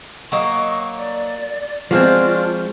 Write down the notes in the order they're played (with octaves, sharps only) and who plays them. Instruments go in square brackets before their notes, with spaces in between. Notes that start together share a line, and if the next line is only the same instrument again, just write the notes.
[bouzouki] F#3 A#3 D#5 [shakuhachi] C#6
[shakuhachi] D5
[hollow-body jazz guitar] F3 G#3 C4 [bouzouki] D4 F#4 [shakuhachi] F4